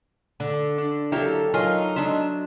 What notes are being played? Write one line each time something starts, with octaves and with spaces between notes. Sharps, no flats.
D3
D4
F#3 A#3 E4 G4 A4
F#3 D#4 F4 A#4 G#5 C6
G#3 D4 E5